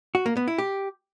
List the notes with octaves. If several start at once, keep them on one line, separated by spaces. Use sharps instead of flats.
F#4
A#3
B3
E4
G4